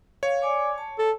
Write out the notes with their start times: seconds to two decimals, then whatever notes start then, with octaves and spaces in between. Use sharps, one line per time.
0.23 C#5 F5
0.42 D5 G#5 D6
0.78 A5
0.99 A4